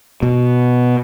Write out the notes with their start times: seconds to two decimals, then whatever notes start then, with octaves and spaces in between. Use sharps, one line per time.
0.23 B2